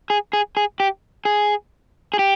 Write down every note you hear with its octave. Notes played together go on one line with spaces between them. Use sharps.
G#4
G#4
G#4
G4
G#4
G#4
G4